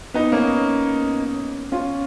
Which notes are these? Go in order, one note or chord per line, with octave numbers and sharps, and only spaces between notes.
B3 D#4
A#3 C#4
C#4 F4